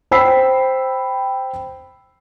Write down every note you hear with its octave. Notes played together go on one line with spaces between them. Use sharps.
C5 G5 B5 E6 B6 C7